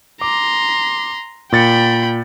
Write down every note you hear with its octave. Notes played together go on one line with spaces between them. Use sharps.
A#5 C6 D6
A#2 G5 B5 A6 C#7